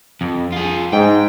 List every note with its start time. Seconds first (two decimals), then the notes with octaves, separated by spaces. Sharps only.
0.21 F2
0.52 F4 G#4
0.93 G#2 G5